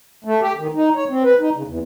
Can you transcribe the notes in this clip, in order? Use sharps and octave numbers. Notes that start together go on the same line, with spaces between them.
A3
G4
D#3
D#4
C#5
C4
B4
D#4
C#3
E2